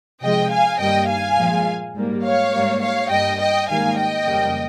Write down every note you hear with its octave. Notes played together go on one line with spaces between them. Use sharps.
C3 F3 G#3 D#5 G5
F5 G#5
G2 D#3 G3 A#3 D#5 G5
F5 G#5
A#2 F3 G#3
G#2 G3 A#3
C#5 F5
G#2 G3 A#3
C#5 F5
G2 G3 A#3 D#5 G5
D#5 G5
G#2 D#3 G3 A#3 F5 G#5
D#5 G5
F2 C#3 G3 A#3